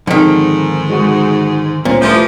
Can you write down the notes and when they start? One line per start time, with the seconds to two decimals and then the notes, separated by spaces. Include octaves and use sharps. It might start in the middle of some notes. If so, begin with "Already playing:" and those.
0.07 G#2 D3 D#3 F3 C4
0.90 G#3 F#4
1.85 D1 A#2 G3 B3 C#4 C5
2.01 G2 E3 F3 A3 E5